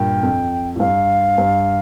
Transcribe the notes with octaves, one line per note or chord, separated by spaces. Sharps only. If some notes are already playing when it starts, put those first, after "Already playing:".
Already playing: G2 A#2 G5
F2
A2
G2 F5
G2